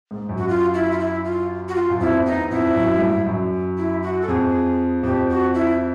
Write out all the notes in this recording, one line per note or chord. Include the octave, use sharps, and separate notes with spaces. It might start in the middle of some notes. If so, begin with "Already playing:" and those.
G#2
F#2
F#4
F4
E4
F4
E4
F4
F#4
F4
F#2
F2 E4
E2 D#4
F2 E4
F#2
G#2
G2
F#2
E4
F#4
A4
F2 G#4
F2 G4
F#4
E4